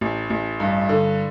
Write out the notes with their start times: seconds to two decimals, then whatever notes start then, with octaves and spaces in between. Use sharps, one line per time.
0.01 A1
0.30 A1
0.60 G2
0.89 D3